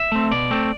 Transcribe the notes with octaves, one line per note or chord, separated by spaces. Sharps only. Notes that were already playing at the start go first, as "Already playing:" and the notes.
Already playing: E5
A3 C4
B2 D5
A3 C4